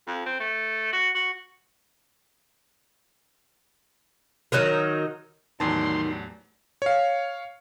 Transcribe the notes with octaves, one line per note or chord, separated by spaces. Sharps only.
F2
C4
A3
F#4
F#4
D#3 F#3 D#4 A#4
E2 A2 D#3 F#3 G3 A5 C6
C#5 F5